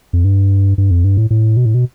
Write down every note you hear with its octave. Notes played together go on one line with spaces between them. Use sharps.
F2
G2
G2
F2
G2
A2
A2
B2
A2
B2